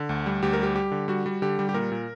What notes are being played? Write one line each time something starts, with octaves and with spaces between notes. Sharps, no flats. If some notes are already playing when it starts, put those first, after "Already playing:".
Already playing: D3
D2
G3
D2 G4
A#4
G3 G4
G3 G4
D3
G3 F#4
G3
D3 G4
G3
G4
A#2 A#4
A#2